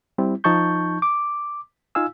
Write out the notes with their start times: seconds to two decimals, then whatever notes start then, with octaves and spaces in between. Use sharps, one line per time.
0.18 G3 C4 E4
0.44 F3 D#4 A5 C#6 G6
1.02 D6
1.95 D#4 F4 F5 G#5 E6